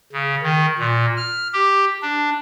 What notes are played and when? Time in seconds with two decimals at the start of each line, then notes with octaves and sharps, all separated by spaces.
0.13 C#3
0.43 D#3
0.79 A#2
1.17 F6
1.53 G4
2.02 D4